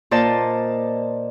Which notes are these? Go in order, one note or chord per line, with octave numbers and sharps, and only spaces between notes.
A#2 C5 D5 D#5 A5